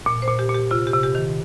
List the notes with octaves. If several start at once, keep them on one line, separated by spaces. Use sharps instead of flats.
A#2
C5
A#2
G4
A#2
G4
C3 F4
G4
C3
G4
D#3